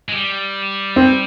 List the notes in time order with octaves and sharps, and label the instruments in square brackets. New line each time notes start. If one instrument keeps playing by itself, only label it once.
[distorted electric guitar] G#3
G3
[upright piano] C4